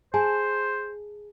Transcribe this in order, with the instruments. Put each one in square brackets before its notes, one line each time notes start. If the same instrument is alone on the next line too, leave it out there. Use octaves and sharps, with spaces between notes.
[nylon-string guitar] G#4 A5 [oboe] C5 [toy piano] G#5